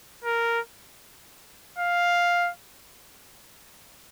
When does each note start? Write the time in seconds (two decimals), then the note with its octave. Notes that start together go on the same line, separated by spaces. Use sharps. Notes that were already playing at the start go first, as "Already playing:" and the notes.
0.24 A#4
1.78 F5